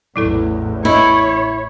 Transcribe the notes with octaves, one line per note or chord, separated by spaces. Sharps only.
A1 E2 A2 F#3 E4 A4
E4 C#5 D#5